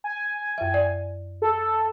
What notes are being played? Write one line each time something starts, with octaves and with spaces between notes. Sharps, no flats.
G#5
F#2 E5
D5
A4